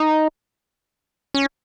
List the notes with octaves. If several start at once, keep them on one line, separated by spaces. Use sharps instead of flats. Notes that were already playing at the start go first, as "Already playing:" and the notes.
Already playing: D#4
C#4